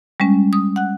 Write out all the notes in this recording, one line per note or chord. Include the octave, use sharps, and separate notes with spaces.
G3 G#3 C#4
D#6
F#5 F#6